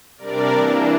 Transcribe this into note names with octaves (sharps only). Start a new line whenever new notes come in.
C3 G3 D4 A#4 D5
E3 A#3 D4